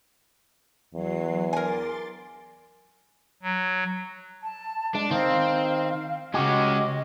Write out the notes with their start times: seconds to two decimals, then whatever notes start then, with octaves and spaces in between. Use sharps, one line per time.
0.95 E2 F#3 C7
1.53 A#4 G#5 C6 D6 A6
3.43 F#3
4.43 A5
4.95 G#3 D4
5.11 D#3 C4 D#4 F5
6.34 C#3 G#3 C#4 F#4 G4 D#5